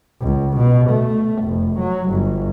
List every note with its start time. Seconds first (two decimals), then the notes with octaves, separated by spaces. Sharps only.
0.20 C#2
0.57 B2
0.90 A3
1.43 F1
1.79 F#3
2.10 G1